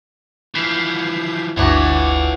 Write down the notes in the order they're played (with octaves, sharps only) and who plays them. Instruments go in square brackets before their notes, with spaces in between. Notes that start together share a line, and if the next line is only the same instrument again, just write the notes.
[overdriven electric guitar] E3 F3 [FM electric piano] G6 B6 C7
[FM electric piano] G1 D2 D6 [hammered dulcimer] E3 D4 F#4 [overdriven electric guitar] F4 C#5